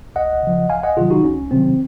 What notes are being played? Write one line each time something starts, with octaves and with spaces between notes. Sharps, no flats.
C#2 D#5 F#5
C#3 F3
C#2 F5 G#5
D#5 F#5
C3 D#3 F#3 F4 G#4
D#4 F#4
C#2 C#4
C3 D#3 F#3 C4